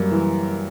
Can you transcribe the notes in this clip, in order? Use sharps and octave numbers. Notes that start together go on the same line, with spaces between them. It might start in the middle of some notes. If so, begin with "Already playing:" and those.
Already playing: F#2 G3 A#3
E3